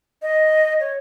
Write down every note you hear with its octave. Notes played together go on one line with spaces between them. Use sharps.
D#5
C#5